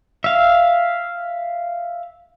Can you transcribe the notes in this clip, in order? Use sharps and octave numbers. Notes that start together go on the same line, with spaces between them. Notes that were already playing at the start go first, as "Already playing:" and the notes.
E5 F5